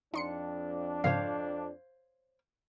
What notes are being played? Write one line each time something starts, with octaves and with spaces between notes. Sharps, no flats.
F2 D4 D#4 C6 C#7
G#2 C#3 F3 C5 C#5 F5